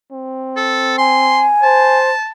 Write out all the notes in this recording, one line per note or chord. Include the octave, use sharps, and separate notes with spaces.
C4
A4
G#5 C6
C5 A5